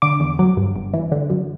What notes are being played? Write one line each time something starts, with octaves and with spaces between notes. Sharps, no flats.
D3 D6
E2
F#3
G2
G1
E3
D3
F#2